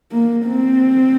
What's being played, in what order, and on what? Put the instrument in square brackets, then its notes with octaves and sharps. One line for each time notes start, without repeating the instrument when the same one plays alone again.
[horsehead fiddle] A#3
C4